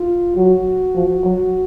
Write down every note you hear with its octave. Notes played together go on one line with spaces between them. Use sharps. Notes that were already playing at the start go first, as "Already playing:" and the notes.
Already playing: F4
F#3 F#4
F3
F#3